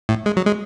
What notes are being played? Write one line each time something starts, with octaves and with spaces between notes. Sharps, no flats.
A2
G#3
F#3
G#3